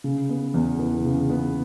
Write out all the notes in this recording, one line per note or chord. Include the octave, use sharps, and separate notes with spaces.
C#3
B3
E2
E3
C#3
B3